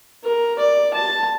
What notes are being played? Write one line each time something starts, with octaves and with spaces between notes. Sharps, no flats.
A#4
D5
A5